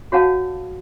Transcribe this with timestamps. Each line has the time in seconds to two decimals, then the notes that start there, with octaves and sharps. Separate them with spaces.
0.12 F#4 C#5 F5 F#5 A5